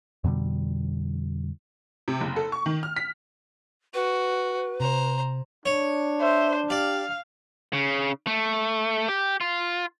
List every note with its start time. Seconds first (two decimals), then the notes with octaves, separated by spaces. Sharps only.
0.24 F2 B2 D3 G3
2.08 C3
2.21 F#1
2.36 A4
2.52 C#6
2.66 D#3
2.83 F6
2.96 B6
3.94 F#4 B4
4.80 C3 C5 A#5
5.66 D4 C#5
6.21 C5 E5
6.70 G4 D5 F5
7.73 C#3
8.27 A3
9.08 G4
9.41 F4